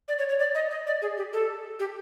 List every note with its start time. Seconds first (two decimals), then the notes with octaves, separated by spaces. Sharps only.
0.08 D5
0.19 C#5
0.29 C#5
0.39 D5
0.55 D#5
0.71 D#5
0.87 D5
1.02 G#4
1.17 G4
1.33 A4
1.79 G4